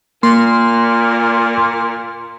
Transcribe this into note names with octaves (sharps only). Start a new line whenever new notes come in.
A#2 A#3 C6